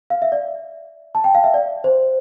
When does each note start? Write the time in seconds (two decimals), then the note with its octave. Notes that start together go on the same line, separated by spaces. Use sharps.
0.10 F5
0.22 E5
0.32 D5
1.15 A5
1.24 G5
1.35 F5
1.44 E5
1.54 D5
1.84 C5